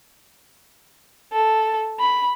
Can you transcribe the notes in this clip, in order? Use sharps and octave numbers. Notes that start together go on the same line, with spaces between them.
A4
B5